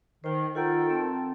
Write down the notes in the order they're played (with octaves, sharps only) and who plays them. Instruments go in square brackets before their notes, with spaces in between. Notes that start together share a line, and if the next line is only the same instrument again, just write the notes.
[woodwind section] D#3 [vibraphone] C5 G5
[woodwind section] D#3 A4 G5 [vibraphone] F4 F#5 A#5
[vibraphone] C4 A5